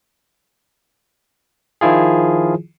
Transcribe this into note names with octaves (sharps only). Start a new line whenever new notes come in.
D#3 F3 E4 F4 G#4